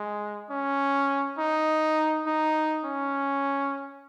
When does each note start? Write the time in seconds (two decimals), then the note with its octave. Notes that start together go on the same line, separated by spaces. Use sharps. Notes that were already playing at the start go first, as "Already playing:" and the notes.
Already playing: G#3
0.50 C#4
1.38 D#4
2.26 D#4
2.84 C#4